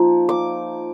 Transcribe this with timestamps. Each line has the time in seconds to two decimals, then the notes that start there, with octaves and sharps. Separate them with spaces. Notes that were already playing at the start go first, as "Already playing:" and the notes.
Already playing: F3 A#3 D#4
0.29 D6